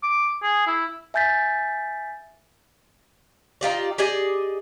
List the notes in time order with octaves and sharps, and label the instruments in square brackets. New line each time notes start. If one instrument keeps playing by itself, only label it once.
[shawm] D6
G#4
E4
[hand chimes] E5 G#5 G6 A6 B6
[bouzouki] D#4 F4 G4 D5
G4 G#4 D5 D#5